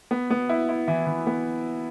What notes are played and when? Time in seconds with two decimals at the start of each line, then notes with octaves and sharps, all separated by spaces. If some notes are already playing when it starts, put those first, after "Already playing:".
0.11 B3
0.30 B3
0.49 E4
0.69 E4
0.88 E3
1.07 E3
1.27 B3